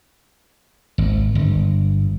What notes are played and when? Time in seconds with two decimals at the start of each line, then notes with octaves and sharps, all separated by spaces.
0.98 G#1
1.35 G1